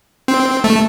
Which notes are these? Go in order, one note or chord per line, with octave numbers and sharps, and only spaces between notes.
C4
A3